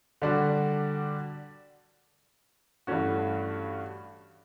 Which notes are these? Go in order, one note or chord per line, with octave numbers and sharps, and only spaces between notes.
D3 G3 D4 F#4
G2 E3 A3 C#4 F#4